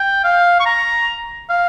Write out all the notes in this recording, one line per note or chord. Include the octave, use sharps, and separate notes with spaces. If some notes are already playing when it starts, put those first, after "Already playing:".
Already playing: G5
F5
C#6
A#5
F5